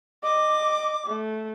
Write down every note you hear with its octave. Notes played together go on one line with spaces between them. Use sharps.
D#5 D6
A3